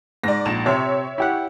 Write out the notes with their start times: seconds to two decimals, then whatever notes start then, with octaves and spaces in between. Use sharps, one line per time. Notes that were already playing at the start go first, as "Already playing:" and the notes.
0.24 G#2 D5 A#6
0.45 A#1 E7
0.66 C3 C#5 E5
1.18 E4 G4 F#5